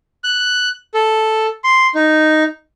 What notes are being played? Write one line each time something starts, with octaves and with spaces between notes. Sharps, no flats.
F#6
A4
C6
D#4